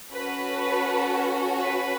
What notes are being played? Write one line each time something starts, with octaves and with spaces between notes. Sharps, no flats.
C#4 F#4 A4 B4
B4